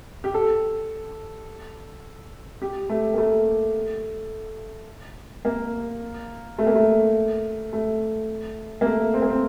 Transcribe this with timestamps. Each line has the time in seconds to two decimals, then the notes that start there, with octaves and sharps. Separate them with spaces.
0.24 G4
0.34 A4
2.62 G4
2.89 A3
3.14 A#3
3.18 A3
5.45 A#3
6.59 A3
6.67 A#3
6.75 A3
7.73 A3
8.81 A#3
8.86 A3
9.14 C4
9.22 A#3
9.30 C4